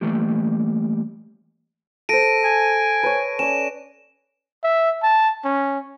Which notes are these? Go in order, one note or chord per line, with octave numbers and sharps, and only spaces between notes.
E3 G3 A3 A#3 G4
A4 C5 A#6 D7 D#7
G#5
B4 C#5
C#4 D5 E7
E5
A5
C#4